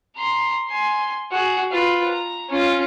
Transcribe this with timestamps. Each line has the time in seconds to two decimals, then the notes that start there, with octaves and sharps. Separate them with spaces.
0.16 A#5 C6
0.68 G#5 C6
1.31 F#4 G#4
1.71 F4 B4
2.09 A#5
2.50 C#4 F4